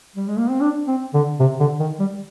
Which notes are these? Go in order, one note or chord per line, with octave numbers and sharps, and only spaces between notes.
G3
G#3
A#3
C4
D4
C4
D3
C3
D3
D#3
G3